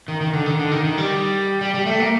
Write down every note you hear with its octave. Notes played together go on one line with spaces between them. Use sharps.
D#3
D#3
D3
D#3
D3
D#3
D#3
G3
G3
G3
A3
A#3